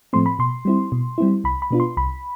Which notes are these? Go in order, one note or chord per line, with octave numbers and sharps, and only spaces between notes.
A2 F3 A3 C4 C6
B5
B2 C6
G3 C4 E4
B2
G3 C4 E4
C2 B5
B5
B2 B3 D4 F4
C6
C2 B5